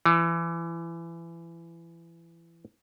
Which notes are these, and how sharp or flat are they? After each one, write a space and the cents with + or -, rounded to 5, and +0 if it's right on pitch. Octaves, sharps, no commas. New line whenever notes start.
E3 +25